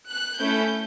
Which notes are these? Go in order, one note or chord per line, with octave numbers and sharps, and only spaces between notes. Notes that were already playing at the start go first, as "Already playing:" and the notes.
F#6
A3 C#4 E4 A4 G6